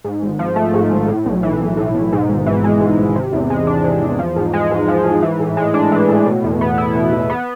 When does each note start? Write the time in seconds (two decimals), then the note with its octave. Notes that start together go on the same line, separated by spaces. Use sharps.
0.04 G#2
0.23 G#1
0.39 F3
0.56 A3
0.74 G#2
0.90 G#1
1.08 A2
1.26 B1
1.43 E3
1.60 B1
1.77 A2
1.95 B1
2.12 G#2
2.29 G#1
2.46 E3
2.64 G#3
2.81 G#2
2.98 G#1
3.16 C3
3.33 E2
3.50 G#3
3.67 D4
3.84 C3
4.01 E2
4.19 F3
4.36 G#2
4.54 G#3
4.71 G#2
4.88 F3
5.05 G#2
5.22 E3
5.40 A2
5.57 G#3
5.74 D4
5.92 E3
6.09 A2
6.26 B2
6.44 E2
6.61 B3
6.78 E4
6.95 B2
7.12 E2
7.30 B3